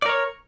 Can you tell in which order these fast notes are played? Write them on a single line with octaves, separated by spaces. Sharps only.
D5 A#4 C#5